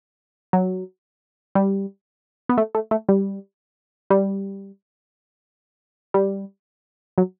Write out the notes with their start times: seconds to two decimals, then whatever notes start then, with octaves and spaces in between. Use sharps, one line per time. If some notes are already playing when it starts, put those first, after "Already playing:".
0.53 F#3
1.55 G3
2.49 B3
2.58 A3
2.75 A3
2.91 A3
3.09 G3
4.10 G3
6.14 G3
7.18 F#3